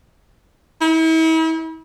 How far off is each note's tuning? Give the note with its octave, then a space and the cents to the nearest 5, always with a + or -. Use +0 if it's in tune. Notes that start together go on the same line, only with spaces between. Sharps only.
E4 -40